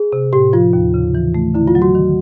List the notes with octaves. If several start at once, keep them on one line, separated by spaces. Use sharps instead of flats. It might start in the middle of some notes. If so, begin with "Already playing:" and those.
Already playing: G#4
C3
A2 G4
F3 F4
D#2
C#3
E3
A3
D3 E4
F4
F#3
F#4
D#3